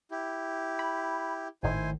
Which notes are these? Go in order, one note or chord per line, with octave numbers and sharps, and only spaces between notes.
E4 G4
B5
G#1 A2 D#3 E4 C5 G#5